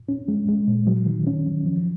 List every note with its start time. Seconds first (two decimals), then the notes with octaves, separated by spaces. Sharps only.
0.09 C#4
0.28 G#3
0.48 G#3
0.68 A#2
0.87 F#3
1.06 D#3
1.27 C#4
1.46 F#3
1.66 F3